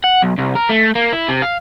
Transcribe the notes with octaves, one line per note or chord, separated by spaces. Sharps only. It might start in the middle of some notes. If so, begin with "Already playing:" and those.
F#5
B1
C2
A#4
A3
A#3
E4
C3
F5